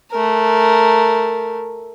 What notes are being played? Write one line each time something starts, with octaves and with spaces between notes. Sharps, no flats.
A3 A#4